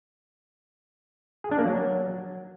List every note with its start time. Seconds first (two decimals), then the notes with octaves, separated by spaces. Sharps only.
1.44 G#4
1.51 D4
1.59 A#3
1.66 F#3